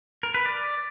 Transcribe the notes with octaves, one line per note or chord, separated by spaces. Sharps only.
A#4
B4
D5